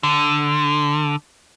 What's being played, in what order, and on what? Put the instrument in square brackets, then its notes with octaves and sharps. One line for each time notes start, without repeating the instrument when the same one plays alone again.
[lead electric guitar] D3